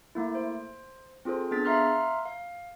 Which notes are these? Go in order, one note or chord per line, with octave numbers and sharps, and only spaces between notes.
A3 A#3 E4
C5
C4 F4 G#4 A4 C5
B3 D4 G#4 A6 B6
E5 F5 A#5 C6 F6 F#6
F5